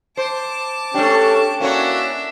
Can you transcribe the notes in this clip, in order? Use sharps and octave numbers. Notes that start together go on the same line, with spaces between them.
C5 A5 D6
A3 C#4 D4 G4
A#3 C#4 D4 E4 F#4 C#5 E5